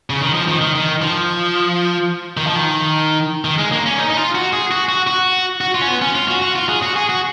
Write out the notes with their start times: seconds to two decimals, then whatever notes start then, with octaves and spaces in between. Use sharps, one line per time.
0.10 C#3
0.21 D#3
0.34 F3
0.48 D#3
0.61 D#3
0.75 D#3
1.02 F3
2.37 D#3
2.47 F3
2.56 D#3
3.45 D#3
3.58 G#3
3.72 A#3
3.86 C#4
3.98 D#4
4.10 D#4
4.17 F4
4.35 F#4
4.53 G#4
4.71 F#4
4.89 F#4
5.07 F#4
5.61 F#4
5.75 F4
5.81 C#4
5.88 B3
6.02 C#4
6.15 F4
6.28 F#4
6.42 F#4
6.55 F4
6.69 G#4
6.82 F#4
6.96 G#4
7.09 F#4